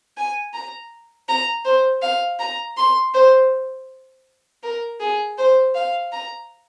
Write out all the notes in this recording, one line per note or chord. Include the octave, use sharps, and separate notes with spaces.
G#5
A#5
A#5
C5
F5
A#5
C6
C5
A#4
G#4
C5
F5
A#5